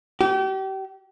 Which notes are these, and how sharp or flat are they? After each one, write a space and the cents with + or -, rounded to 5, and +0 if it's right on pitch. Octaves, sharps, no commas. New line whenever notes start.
G4 -35